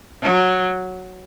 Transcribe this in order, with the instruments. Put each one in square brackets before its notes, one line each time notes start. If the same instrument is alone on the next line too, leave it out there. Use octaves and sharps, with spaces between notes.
[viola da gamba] F#3